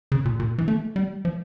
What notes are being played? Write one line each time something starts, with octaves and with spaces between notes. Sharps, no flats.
C#3
A#2
A#2
E3
A3
G3
F3